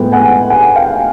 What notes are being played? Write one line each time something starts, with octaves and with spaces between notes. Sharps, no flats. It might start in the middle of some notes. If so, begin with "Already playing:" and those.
Already playing: A2 F3 G#3 B3 G5
F#5 G#5
F#5 G#5
F5 G5